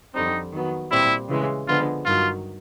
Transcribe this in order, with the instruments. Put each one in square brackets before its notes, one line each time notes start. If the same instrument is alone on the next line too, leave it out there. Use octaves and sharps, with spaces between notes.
[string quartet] F2 D3 G3 C4 [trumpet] D#4
[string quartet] D#3 F#3 B3
[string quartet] A#2 G3 C4 [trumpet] E4
[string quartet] C#3 E3 G#3
[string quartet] D3 F3 G#3 B3 [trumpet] F4
[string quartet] G2 D#3 F#3 [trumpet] F4